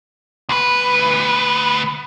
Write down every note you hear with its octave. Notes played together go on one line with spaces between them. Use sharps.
D2 B4